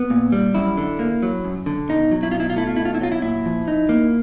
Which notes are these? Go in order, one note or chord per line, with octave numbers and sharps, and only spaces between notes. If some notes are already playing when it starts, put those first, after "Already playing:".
Already playing: B3
A#2
G3
F#2 E4
D3
A#3
F#3
F#2
D3
B2 D#4
F#3
E4
B2 F4
E4
F4
A3 E4
F4
B2 E4
F4
E4
F#3 F4
E4
A#2 E4
F3
D#4
A#3